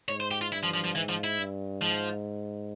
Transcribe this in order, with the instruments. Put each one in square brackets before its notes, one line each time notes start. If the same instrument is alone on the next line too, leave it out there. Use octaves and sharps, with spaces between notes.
[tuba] G#2 [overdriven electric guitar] C#5
[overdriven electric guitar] C5
G4
F4
[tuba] G2 [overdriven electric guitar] E4
[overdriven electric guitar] F3
F3
F3
[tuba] G#2 [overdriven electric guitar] E3
[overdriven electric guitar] F3
E4
[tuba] G2
[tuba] G#2 [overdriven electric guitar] F3